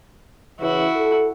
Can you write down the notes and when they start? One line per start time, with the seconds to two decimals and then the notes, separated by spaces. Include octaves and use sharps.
0.60 C#3 E3 E4 F#4
0.96 A4